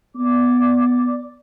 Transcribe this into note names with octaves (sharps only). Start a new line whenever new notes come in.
B3 D5 D6